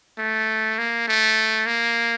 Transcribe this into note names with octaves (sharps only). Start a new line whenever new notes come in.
A3
A#3
A3
A#3